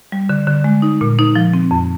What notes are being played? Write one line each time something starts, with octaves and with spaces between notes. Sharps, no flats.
G3
D3
D3
G#3
D#4
A#2
D#4
F3
C4
F2